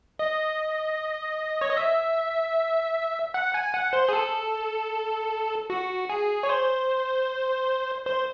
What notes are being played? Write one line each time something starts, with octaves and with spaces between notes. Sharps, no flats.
D#5
C#5
D#5
E5
F#5
G#5
F#5
C5
G#4
A4
F#4
G#4
C#5
C5
C5